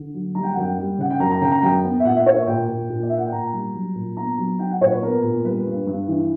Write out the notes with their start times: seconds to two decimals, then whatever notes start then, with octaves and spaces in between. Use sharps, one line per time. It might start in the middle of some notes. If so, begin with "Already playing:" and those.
Already playing: D3
0.14 F#3
0.35 G3 A#5
0.43 G5
0.53 F#5
0.57 F#2 G5
0.78 G3
0.98 C#3 F#5
1.10 G5
1.20 F#2 A#5
1.32 A#5
1.41 C#3 G5
1.52 A#5
1.63 F#2 G5
1.84 B3
2.00 E5
2.05 A#2 F#5
2.16 E5
2.26 A#3 C#5
2.36 E5
2.47 A#2 G5
2.68 A#2
2.90 A#2
3.03 D5
3.09 A#3 E5
3.17 F#5
3.25 G5
3.32 A#2 A#5
3.53 G3
3.75 F#3
3.95 A#2
4.17 B3 A#5
4.38 F#3
4.59 F#3 G5
4.71 F#5
4.81 A#2 C#5
4.92 B4
5.02 B3 A#4
5.24 A#2
5.45 G3 B4
5.66 G2
5.87 G2
6.08 E3